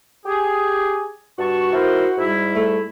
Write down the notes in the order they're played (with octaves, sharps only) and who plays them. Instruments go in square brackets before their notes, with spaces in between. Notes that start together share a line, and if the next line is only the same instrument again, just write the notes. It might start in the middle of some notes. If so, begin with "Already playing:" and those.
[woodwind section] G4 G#4
[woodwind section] G2 A5 C#6 [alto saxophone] F#4
[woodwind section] E4 A#4 C5
G#2 G3 E4
[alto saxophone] A3